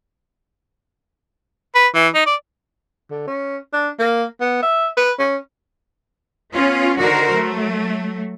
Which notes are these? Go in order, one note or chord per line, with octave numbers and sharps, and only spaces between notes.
B4
E3
D#4
D5
D3
C#4
D4
A#3
B3
E5
B4
C#4
B3 C#4 F4
D3 D#3 F#4 A#4 C5
F#3 A3